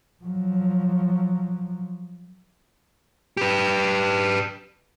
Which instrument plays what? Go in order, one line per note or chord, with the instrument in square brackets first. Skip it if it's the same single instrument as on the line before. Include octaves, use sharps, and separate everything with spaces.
[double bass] F3 F#3
[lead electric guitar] G4 B4